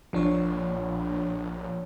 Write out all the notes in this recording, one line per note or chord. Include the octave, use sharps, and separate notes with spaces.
A#1 F3 D4 C#5